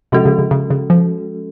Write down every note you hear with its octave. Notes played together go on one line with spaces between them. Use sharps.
C3 F3 G#3 C#4 F#4 A4
C#3
C#3
C#3
C#3
F3